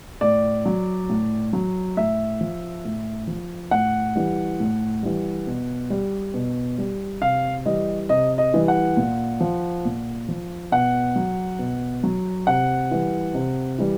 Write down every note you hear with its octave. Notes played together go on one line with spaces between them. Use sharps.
A2 D5
F#3
A2
F#3
A2 E5
F3
A2
F3
A2 F#5
E3 G3
A2
E3 G3
B2
G3
B2
G3
C3 F5
E3 G3 D#5
C3 D#5
D#5
E3 G3
F#5
A#2
F3
A#2
F3
B2 F#5
F#3
B2
F#3
C3 F#5
E3 G3
C3
E3 G3